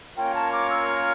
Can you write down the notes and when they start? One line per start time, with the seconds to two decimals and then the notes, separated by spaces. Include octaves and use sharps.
0.17 A#3 C#4 F4 A#4 C#5 G5
0.35 A5
0.52 D6
0.70 E6
0.88 F6